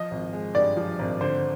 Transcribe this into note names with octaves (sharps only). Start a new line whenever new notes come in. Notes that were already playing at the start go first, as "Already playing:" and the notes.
Already playing: F3 D#5
G#1
G#3
G2 D5
F3
G#1
D3 C5